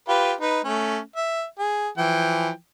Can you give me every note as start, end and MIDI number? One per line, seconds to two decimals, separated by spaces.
0.08 0.33 65
0.08 0.33 67
0.08 0.33 71
0.41 0.60 63
0.41 0.60 71
0.64 0.98 57
0.64 0.98 61
1.16 1.44 76
1.59 1.88 68
1.98 2.50 52
1.98 2.50 53
1.98 2.50 79